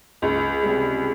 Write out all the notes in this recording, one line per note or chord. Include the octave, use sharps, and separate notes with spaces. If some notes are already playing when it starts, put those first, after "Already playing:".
C#2
C3 G3